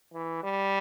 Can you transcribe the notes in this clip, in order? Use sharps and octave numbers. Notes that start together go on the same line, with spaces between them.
E3
G3